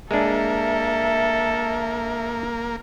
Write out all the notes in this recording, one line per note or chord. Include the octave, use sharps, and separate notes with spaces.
G#3 A#3 D4 A4 E5